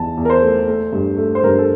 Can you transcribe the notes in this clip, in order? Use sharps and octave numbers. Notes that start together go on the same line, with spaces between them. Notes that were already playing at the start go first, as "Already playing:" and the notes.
Already playing: E2 E3 A5
E2
A#4
C5
A3
A3
G2
A3
C5
G2 A#4
A4